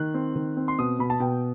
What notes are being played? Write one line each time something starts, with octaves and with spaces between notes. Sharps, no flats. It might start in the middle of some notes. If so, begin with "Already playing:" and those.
Already playing: D#3 F#6
C4
D#3
C4
C6
B2 D#6
B2 B5
A5
B2 G5